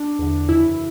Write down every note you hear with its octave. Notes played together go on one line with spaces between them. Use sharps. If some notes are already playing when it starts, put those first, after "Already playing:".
Already playing: D4
E2 D3
F#2 C#3 E3 E4